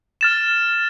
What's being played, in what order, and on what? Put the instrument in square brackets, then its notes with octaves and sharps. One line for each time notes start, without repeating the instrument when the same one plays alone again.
[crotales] F6 A6 E7